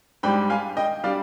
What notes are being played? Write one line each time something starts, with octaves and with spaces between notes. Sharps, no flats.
G#2 G3 D4 G5 B5
F5 G#5
D#5 G5
G3 D4 D5 F5